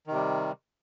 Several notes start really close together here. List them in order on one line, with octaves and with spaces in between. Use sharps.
D#3 C3 G3